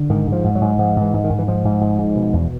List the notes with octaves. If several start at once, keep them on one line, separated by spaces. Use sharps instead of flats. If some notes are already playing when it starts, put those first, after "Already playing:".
Already playing: D3
G#2 D#3
G#2
F3
G#2
F#3
G#2
G#2 F3
G#2
E3
G#2
D#3
G#2
E3
G#2 F3
G#2
G#2
G#2
B2
E2